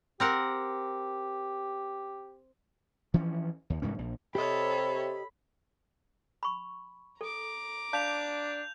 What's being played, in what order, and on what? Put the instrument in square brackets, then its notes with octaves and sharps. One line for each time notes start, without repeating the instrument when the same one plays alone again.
[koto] C4 A#4 F#5 [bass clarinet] G4
[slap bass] E3 F3 C#4
D#2
C2 G#2 E3 C#4
A#1
[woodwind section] C3 [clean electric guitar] G4 D#5 [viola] A4 C#5 [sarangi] B5
[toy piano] B5 C#6
[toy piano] A4 [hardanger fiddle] A#5 D6
[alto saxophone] D4 [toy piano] F5 A5 [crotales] G6 F7